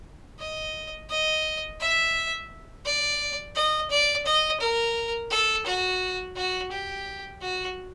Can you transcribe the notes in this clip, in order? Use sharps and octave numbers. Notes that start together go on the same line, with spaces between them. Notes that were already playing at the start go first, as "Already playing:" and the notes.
D#5
D#5
E5
D5
D#5
D5
D#5
A#4
A4
F#4
F#4
G4
F#4